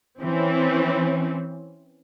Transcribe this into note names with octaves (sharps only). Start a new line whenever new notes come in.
E3 C4 C#4